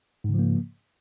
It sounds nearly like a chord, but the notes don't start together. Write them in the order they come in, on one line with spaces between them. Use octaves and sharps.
G#2 C#3 F3 A#3